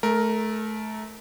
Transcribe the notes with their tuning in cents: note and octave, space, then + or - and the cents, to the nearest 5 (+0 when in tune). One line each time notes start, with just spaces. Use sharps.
A3 -25 A#4 +0